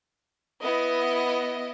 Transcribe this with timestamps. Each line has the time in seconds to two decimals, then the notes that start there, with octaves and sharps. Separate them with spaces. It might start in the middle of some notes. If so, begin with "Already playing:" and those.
0.64 B3 E4 D#5